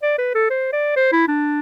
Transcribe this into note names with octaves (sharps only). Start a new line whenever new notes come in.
D5
B4
A4
C5
D5
C5
E4
D4